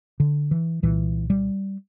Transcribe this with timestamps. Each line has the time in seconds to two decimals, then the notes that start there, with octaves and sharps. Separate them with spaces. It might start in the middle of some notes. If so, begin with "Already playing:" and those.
0.20 D3
0.51 E3
0.83 C2 A#2 E3
1.30 G3